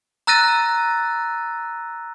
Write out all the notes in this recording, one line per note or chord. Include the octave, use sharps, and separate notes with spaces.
A#5 E6 F#6 A6 A#6 D#7